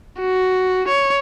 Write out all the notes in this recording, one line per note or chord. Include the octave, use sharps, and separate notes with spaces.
F#4
C#5